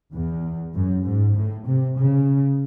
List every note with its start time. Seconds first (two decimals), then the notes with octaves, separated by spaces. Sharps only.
0.13 E2
0.74 F#2
1.04 G#2
1.35 A2
1.65 C3
1.96 C#3